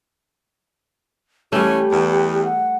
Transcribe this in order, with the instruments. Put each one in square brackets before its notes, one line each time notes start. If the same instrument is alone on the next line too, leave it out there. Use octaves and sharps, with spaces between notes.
[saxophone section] E3 C#4 [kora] G3 A3 [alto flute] G4
[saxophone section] E2
[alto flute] F#5